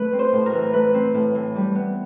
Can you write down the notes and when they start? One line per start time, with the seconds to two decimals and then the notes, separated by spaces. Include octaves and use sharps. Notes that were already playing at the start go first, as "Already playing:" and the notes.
Already playing: A3 B4
0.13 C4
0.19 C5
0.33 A2
0.46 A#4
0.53 E3
0.73 A3 B4
0.94 C4
1.14 A2
1.35 E3
1.56 G3
1.75 B3